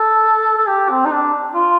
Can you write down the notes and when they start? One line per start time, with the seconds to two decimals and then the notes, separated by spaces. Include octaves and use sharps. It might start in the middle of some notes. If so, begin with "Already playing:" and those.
Already playing: A4
0.57 A4
0.68 G4
0.90 C4
1.05 D#4
1.12 D4
1.54 F4